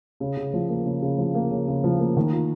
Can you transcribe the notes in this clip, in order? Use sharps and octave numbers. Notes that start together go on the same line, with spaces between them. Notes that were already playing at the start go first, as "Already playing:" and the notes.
C#3
C#3
F3
A#3
C#3
C#3
F3
A#3
C#3
C#3
F3
A#3
D#3
F4